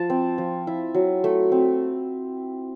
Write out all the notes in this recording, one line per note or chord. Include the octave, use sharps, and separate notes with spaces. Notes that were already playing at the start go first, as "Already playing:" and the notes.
Already playing: F3 A5
C4
F3
E4
F#3
A3
C4